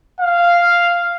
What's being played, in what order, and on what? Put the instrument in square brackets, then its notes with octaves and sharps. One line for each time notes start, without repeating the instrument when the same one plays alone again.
[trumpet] F5